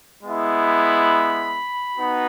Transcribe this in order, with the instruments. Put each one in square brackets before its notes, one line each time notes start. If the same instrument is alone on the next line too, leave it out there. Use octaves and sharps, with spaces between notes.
[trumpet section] G#3 B3 E4
B5
B3 D#4 F#4